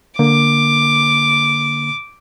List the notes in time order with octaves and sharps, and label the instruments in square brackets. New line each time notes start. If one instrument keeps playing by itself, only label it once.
[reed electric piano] D3 A#3 [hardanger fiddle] D6